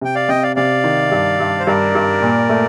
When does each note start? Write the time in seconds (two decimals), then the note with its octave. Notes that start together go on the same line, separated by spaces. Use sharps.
0.01 C3 G5
0.15 D5 F5
0.29 C3 D#5 G5
0.43 D5 F5
0.56 C3 D5 F5
0.84 D#3
1.11 G2
1.40 G2
1.60 C5
1.67 G2 A#4 D5
1.95 G2
2.22 A#2
2.49 A3